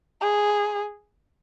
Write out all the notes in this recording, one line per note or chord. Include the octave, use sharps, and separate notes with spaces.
G#4